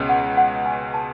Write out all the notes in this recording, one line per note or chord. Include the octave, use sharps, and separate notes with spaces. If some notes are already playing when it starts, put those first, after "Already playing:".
Already playing: C#2 B2 G#3 C#4
F#5
F#5
G#5
A5